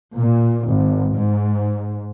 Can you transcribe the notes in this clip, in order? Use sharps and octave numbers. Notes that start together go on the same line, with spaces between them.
A#2
G#1
G#2